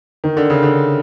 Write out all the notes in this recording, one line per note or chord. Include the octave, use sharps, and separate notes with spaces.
D#3
D3
C#3
D3